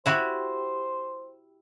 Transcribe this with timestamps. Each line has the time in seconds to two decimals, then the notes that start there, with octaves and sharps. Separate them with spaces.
0.06 E4 F#4 G4 C5